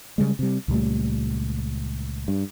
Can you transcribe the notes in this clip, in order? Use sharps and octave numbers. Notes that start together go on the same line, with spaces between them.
C#3 G3 G#3
C3 G3
C#2 A#2 G3 A3
G2